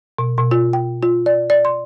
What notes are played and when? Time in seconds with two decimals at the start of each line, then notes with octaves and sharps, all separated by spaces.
0.18 B2
0.38 B2
0.51 F4
0.73 G5
1.03 F4
1.26 D5
1.50 D5
1.65 C6